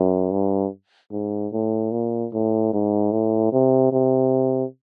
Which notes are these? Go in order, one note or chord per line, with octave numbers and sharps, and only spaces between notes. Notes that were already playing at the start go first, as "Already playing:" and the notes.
Already playing: F#2
G2
G#2
A2
A#2
A2
G#2
A2
C3
C3